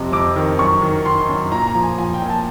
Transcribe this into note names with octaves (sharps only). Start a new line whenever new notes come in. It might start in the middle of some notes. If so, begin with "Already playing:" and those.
Already playing: F2 C3
F2 D6
D#3
F#2 C#6
D#3
D#3 C6
F#2
A#2 A#5
A#5
F3
G#5
F3 G#5
G5
A#2
A5